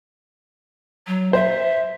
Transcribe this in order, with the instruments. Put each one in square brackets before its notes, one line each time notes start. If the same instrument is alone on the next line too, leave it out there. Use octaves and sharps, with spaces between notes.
[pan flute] F#3
[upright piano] C5 [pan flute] E5